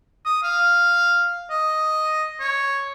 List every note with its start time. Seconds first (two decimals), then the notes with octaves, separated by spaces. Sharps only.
0.26 D#6
0.43 F5
1.50 D#5
2.40 C#5